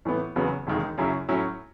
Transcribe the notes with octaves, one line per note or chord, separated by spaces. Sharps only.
A2 E3 B3
E2 C#3 F#3 B3
E1 D#2 D#3 G#3
F#2 C#3 F#3 C#4 E4
A2 F#3 C#4 E4